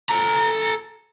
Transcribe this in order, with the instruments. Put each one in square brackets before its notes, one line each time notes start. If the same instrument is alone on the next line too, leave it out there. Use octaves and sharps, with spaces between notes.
[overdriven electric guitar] A4 A#5